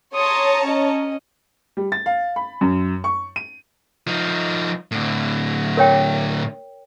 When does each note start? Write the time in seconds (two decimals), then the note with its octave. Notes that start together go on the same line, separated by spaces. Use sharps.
0.14 C#5 A5 A#5 C6 D#6
0.63 C#4 D#5
1.77 G3
1.92 A6
2.06 F5
2.36 B5
2.61 F#2
3.04 C#6
3.36 D#7
4.07 F3 D#4
4.91 A2 D3
5.77 A#4 C#5 G5